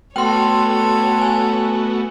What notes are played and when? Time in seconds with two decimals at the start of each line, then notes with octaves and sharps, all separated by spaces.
0.16 A3 B3 F#4 A4 C#5 G5 C6
1.22 G#5